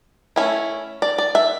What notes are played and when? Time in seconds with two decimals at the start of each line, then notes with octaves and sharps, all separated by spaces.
0.36 A3 C#4 E4
1.02 D5
1.18 D5
1.35 E5